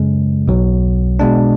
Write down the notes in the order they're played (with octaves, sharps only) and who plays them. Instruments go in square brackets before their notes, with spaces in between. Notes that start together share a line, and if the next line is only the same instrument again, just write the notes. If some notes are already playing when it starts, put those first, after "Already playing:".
Already playing: [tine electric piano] F#2 C#3 G#3
B1 B2 F#3
B2 G#3 D4